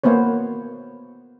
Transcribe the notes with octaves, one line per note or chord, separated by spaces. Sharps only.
A#3 B3 C5 C#5